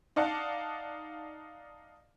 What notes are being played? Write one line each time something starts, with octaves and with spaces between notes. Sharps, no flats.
D#4 D5 F5 F#5 A5